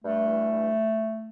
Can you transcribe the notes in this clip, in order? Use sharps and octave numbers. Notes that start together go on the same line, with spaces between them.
G2 A3
E3
G2